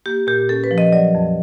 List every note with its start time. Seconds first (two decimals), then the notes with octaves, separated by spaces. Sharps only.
0.06 A#3 G4
0.27 A#2 G4
0.49 C#4 A4
0.64 B4
0.71 F3
0.78 D#5
0.93 F#3 D5
1.15 F2